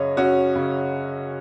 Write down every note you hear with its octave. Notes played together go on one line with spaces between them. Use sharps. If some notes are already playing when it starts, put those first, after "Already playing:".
Already playing: F#2 C#3 C#5 D#5
F#2 C#4 F#4
C#3